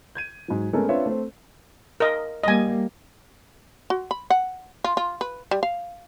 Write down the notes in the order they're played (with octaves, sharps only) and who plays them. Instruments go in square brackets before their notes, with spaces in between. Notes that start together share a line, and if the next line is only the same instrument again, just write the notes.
[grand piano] G6 G#6 D#7
G#2 F#3
G#3 A3 B3 C#4 A4 A#4
C4 D4 F4 B4 C#5 E5
A3 C4 C5
[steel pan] A#4 D#5
[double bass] G3 A#3 [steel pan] D#5 G#5
[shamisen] F#4
B5
F#5
F4
F4
B4
G3
F5